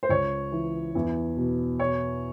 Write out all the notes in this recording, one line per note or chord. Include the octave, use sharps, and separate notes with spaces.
C5
C#2 C#5
E3
E2
B2
B2 C#5